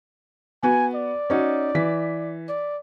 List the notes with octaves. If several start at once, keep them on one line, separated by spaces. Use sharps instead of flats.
B3 F#4 G#5
D5
C#4 D#4 F#4
E3 B6
D5